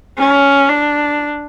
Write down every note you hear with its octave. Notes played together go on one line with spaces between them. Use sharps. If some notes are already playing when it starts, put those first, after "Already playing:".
C#4
D4